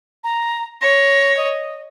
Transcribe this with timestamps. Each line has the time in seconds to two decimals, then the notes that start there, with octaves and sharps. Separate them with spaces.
0.24 A#5
0.81 C#5 A#6
1.37 D#5